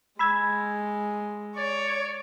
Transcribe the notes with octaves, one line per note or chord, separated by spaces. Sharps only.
G#3 B5 E6 G#6
C#5 D5